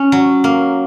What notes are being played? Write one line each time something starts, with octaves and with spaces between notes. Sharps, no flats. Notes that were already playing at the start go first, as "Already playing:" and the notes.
Already playing: C#4
F#3
A#3